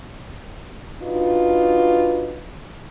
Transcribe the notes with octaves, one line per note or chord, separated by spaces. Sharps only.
D4 D#4 F4 F#4 B4